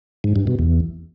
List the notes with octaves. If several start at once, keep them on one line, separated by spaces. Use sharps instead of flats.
G#2
G2
B2
E2